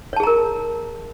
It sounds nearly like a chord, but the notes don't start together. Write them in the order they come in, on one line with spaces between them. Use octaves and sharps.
C#5 A5 G#4 A#5 A#4